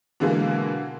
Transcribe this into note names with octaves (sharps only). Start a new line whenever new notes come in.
B2 D3 E3 G#3 A#3